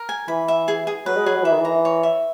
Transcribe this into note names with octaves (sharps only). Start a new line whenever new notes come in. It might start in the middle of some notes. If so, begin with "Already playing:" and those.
Already playing: A#4
G#5
E3 B5
E5
G#4
G#4
F#3 B4
G#3
F#3 G#4
F#3
E3 E5
D#3
E3
A#5
C#5
E5